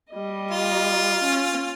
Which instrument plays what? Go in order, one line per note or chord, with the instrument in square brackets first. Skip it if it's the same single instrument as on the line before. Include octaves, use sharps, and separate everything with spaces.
[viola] G3 D#5
[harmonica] F4
[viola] C#4